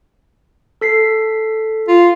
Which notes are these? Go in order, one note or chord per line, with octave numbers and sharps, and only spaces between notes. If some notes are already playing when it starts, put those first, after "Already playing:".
A4 B6 C7
F4